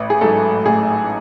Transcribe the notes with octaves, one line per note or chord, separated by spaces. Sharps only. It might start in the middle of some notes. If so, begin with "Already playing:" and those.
Already playing: A1 B4
G#4
G#2 F#3 A3 A4
A1 G#4